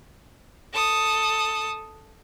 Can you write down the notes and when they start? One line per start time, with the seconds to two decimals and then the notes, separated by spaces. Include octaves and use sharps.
0.73 A4 D#6